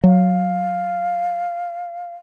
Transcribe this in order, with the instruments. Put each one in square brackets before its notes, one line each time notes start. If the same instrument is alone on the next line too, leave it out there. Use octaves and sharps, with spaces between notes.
[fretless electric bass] F#3 [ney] F5